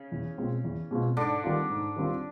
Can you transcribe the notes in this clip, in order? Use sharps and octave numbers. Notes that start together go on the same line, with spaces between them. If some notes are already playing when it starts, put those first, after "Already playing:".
Already playing: C#3 C#4
E2
B2 G#3 C4 F4
E2
B2 G#3 C4 F4
G#2 D3 D4
D#3 G3 C4 F4
G#2
D#3 G3 C4 F4